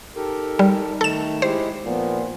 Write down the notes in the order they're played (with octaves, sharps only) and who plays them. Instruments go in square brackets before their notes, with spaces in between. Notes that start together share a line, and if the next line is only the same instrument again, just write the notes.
[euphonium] D#4 [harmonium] G4 A4 A#4
[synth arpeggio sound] G3
[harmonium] D#3 A3 [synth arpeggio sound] A4 E7
[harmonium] G#3 E4 G4 [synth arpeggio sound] C5
[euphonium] A#2 [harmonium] F3 B3